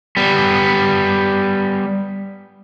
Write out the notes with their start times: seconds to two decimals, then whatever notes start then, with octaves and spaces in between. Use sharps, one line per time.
0.17 G3 B3